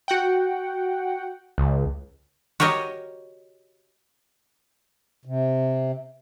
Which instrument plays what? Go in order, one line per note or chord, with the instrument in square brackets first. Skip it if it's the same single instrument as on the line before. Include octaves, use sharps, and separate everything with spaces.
[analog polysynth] F#4 F#5 G5
[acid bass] C#2
[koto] F#4 G4 A#4 C#5 D#5
[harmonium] C3